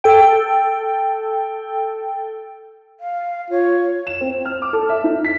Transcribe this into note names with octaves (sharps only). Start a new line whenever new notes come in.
A4 G5
F5
F4 C#5
E7
C4
F6
D6
A4
E5
D#4
B6